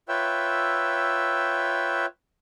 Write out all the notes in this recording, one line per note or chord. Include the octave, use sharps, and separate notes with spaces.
F4 B4 C#5 E5 G5 E6